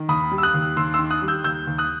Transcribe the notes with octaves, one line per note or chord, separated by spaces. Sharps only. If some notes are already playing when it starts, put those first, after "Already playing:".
Already playing: D#3
D#2 B5 D#6
G3
E6
D#6 F#6
D#2
D#2 C6 E6
D#3 C6 E6
D#6 F#6
G3
E6 G6
D#2 E6 G6
D#2
D#6 F#6